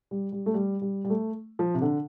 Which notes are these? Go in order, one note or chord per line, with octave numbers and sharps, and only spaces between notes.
G3
G3
A3
G3
G3
G3
A3
F3
C3
D3